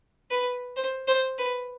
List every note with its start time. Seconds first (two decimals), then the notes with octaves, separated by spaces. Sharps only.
0.31 B4
0.76 C5
1.07 C5
1.39 B4